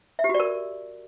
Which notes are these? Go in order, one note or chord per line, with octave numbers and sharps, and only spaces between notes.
E5
G4
F#4
D5
A#4